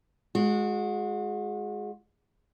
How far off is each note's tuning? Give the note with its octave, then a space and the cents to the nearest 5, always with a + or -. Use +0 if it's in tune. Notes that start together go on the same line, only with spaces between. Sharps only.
G#3 +10 F#4 -30